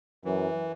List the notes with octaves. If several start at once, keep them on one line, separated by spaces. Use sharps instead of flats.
F#2 E3